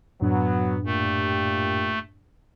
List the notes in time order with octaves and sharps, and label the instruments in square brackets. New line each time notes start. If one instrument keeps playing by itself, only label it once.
[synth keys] F#2 A2 D4 [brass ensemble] F#3 B3
[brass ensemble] A#2 G4 [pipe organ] A3